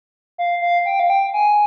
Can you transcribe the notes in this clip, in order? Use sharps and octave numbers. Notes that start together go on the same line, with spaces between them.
F5
F5
G5
F5
G5
G#5